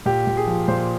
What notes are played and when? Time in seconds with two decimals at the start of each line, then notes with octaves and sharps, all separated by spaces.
0.06 A#2 G4
0.27 A#2
0.37 G#4
0.47 F3
0.68 A#2 C5